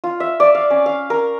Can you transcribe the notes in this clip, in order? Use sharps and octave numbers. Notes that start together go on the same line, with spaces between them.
F4
E5
D5
F5
C#4
F5
A#4